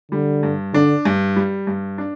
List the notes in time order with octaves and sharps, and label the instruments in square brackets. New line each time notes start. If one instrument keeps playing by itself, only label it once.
[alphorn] D3 [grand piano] G3
[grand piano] G2
[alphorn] D3 [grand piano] D4
[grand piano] G2
G3
G2
D4